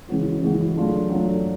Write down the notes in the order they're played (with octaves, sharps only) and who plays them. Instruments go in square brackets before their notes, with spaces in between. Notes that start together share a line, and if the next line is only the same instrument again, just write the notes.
[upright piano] C#3 E3 G#3 C#4 F#4
C#3 E3 G#3 C#4 F#4
F#3 A3 D4 F4
F#3 A3 D4 F4